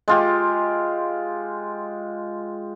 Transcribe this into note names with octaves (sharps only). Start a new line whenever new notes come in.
G#3 F4 G4